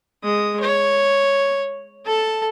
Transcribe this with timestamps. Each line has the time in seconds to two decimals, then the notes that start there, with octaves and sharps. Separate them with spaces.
0.23 G#3 D#6
0.61 C#5
2.05 A4 A5